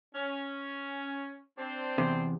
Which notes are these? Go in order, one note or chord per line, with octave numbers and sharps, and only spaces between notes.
C#4
C4 D4 C5
E2 C3